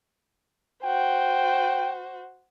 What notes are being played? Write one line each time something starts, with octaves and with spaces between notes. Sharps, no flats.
F#4 C5 G5